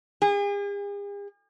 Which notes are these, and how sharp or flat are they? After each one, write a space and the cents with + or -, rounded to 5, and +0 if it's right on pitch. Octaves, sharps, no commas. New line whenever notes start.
G#4 -45